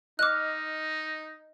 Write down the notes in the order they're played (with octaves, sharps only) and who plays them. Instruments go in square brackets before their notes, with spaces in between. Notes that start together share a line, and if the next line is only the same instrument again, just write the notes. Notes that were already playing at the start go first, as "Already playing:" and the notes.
[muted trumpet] D#4 [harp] D#5 F6 [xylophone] D6 F#6